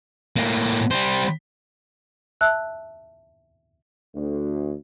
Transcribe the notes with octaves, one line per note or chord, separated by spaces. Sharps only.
A2 A#3
G3 C5
E5 A5 E6 F#6
D2